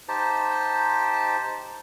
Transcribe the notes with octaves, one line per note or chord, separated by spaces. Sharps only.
D#4 G4 C5 A5